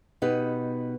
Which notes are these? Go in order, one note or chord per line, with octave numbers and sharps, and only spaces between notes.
B2 B3 D#4 G4 B4